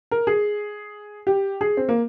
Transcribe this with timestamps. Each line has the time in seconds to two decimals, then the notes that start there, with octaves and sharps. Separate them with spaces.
0.11 A#4
0.27 G#4
1.27 G4
1.61 G#4
1.77 C4
1.89 A#3